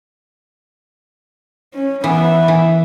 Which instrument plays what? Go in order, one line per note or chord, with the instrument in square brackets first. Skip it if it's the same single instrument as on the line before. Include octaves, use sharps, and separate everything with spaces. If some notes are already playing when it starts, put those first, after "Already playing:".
[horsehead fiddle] C#4
[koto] E3 [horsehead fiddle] B3 E5
[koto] E3